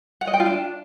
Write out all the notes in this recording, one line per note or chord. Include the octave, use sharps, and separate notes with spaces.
F#5
D#5
G5
F4
D4